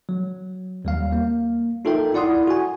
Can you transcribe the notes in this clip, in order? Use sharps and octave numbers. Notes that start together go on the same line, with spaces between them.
F#3
D#2 G3 F5
A#3
D#4 F4 A4 A#4 E5 G5
E4 D5 F#5 C6 D#6
F#4 G#5